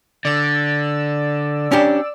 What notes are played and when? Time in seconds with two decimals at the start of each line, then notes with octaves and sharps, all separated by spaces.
0.25 D3 D5 E6
1.72 C#4 D4 G4